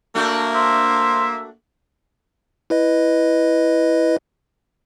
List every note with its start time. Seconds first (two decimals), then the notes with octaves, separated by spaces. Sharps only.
0.15 A3 A#3 D4 F#4
0.54 C5 E5
2.70 E4 B4 D#5